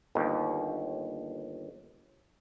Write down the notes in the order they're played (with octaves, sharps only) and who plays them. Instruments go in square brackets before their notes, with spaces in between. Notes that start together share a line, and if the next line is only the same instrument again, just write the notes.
[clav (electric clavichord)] G1 D#2